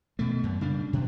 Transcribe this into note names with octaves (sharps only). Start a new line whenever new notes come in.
B2 A3
F#2
C#3 G3 D4
B2